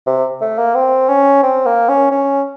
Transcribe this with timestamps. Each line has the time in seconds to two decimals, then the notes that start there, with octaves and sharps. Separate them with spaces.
0.07 C3
0.41 A3
0.58 A#3
0.75 C4
1.09 C#4
1.43 C4
1.66 A#3
1.89 C#4
2.11 C#4